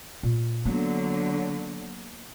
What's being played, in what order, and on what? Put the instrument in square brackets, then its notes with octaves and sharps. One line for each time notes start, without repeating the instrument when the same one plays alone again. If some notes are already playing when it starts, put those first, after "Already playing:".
[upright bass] A#2
[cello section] D3 F#3 [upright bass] A#3 B3